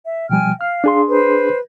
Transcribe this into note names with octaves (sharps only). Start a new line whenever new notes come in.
E5
B2 F3 G3 G5 G#5 F6
F5 F6
D4 G#4 C6
B4 C5